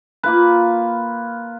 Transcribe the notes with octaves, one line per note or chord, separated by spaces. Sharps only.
A#3 F4 B4